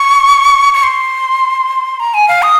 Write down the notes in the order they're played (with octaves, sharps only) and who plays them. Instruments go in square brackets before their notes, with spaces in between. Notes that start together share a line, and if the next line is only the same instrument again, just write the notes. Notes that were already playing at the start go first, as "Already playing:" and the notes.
Already playing: [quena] C#6
C#6
C6
A#5
G#5
F5
D#6